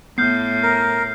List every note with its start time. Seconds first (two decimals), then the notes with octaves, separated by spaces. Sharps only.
0.18 A2 B3 F6 G6 C7
0.63 A#4